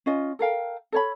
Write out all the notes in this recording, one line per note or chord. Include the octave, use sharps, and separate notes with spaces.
C#4 F4 D#5
A4 A#4 F5 G5
A4 C#5 B5